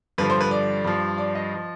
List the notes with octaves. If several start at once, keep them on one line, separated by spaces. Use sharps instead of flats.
G2 D3 F3 B4
C5
B4
D5
G2 F3
D5
D#5
F3